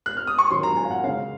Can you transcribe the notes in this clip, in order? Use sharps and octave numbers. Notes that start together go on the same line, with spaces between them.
F#6
F6
D#6
C#6
D#3 F#3 C#4 C6
A#5
G#5
F5
F#5
C#3 G#3 C#4 F5